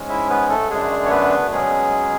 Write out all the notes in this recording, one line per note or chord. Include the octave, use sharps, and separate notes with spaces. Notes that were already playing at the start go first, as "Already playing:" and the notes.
Already playing: G#2 G#3 C#4
E4 E5
B3 B4
A3 A4
F#2 D3 G#3 A3 D4 G#4
C#5
B3 B4
B2 F#3 G#3 C#4 G#4